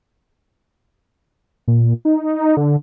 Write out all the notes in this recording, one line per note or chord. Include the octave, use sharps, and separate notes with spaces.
A#2
D#4
D3